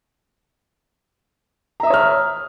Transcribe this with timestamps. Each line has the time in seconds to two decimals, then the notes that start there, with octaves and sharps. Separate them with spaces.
1.80 A#5
1.83 E5
1.87 D#6
1.90 C#5
1.94 F6